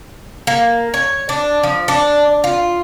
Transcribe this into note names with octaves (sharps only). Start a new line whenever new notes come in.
A#3
C#5
D4
F3
D4
F4